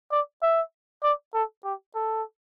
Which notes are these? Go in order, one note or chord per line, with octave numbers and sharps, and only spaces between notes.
D5
E5
D5
A4
G4
A4